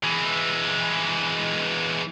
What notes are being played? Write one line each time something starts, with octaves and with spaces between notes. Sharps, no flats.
E3 G#3